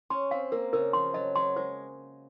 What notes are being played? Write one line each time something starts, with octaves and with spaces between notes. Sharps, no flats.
C#4 C6
C4 F5
A#3 A#4
C#3 A#4
F3 C6
F#3 D#5
F#3 C6
G#3 C5